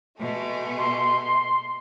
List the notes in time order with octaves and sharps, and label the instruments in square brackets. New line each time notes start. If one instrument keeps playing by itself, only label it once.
[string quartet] B2 G#3 A3
[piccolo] C6